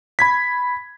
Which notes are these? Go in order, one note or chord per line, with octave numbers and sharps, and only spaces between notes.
B5 G#6 B6